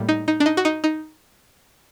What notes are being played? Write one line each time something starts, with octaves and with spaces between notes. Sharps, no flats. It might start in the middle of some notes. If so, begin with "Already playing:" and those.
Already playing: A2 G3 A#3
D#4
D#4
D4
D#4
F#4
D#4
D#4